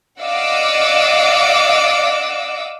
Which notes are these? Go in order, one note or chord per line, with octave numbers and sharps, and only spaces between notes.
D5 D#5 F5 F#5 D6 E6